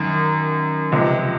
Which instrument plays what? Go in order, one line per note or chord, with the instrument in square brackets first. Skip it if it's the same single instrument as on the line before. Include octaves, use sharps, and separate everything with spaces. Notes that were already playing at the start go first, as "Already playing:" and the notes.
Already playing: [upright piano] F#2 D#3
C#2 C3 F3 D#5